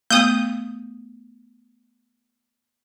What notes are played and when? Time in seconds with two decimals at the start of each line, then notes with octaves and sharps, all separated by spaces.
0.10 A3 B3 D#6 G6